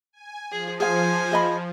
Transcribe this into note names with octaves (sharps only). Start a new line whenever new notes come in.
G#5
F3 G#4
G#4 C5 F5 G#5
G#4 D#5 B5